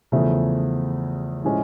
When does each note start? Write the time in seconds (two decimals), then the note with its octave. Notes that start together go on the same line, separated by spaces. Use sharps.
0.12 E2 C#3 F3 A3
1.44 A2 F3 G#3 C#4 E4